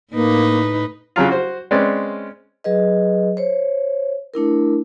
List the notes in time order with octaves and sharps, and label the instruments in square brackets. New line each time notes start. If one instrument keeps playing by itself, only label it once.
[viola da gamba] A2 D#4 B4 [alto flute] A#3
[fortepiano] C#3 F#3 F4
F#4 C5
G#3 C4 C#4 B4 D5
[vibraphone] F#3 G#4 B4 D#5
C5 C#5
A3 D4 E4 A#4